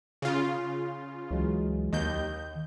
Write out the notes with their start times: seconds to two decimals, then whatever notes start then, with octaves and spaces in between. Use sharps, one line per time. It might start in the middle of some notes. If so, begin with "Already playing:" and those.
0.22 C#3 F4
1.31 C#2 E3 F#3 G#3
1.93 D#2 D#3 D#5 G6